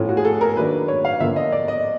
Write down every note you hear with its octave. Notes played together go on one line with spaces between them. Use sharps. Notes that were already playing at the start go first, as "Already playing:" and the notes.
Already playing: A2 F3 A3 C#4
F#4
G#4
A4
A#4
D#3 F#3 A#3 D4 B4
C#5
F5
D3 F3 A#3 C#4 E5
D#5
D5
D#5